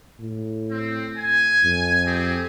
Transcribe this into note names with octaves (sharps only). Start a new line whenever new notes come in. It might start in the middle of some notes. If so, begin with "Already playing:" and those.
A2
C4
G#5
F2
C4 G4 G#4